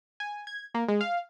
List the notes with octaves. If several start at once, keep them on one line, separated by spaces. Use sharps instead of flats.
G#5
G#6
A#3
G#3
F5